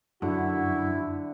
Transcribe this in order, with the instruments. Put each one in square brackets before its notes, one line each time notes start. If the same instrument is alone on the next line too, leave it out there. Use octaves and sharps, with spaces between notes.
[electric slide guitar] F#2 [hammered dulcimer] D3 F#5 [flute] E4 [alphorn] F#4